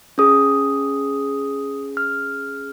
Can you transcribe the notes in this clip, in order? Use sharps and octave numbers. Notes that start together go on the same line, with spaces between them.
C#4 G#4 D#6
F6